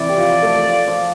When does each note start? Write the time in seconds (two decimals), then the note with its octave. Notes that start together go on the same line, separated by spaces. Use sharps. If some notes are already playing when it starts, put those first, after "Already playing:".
Already playing: C3 E3 C4 E4 D5
0.09 G4
0.17 F3 F4
0.42 A3 A4
0.68 F3 F4
0.87 F3 F4